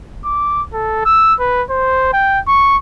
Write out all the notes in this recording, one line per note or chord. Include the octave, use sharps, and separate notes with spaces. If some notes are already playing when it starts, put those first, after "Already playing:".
D6
A4
E6
B4
C5
G5
C#6